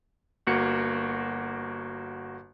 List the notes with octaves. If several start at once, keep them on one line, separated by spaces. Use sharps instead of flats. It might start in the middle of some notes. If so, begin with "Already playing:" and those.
G1 A#3 F#4 C#7